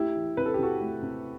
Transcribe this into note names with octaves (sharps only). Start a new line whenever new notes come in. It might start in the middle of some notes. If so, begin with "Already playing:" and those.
Already playing: A3 E4 G4
E3
C3 B4
A4
G4
C3 F#4 A4
A3
C3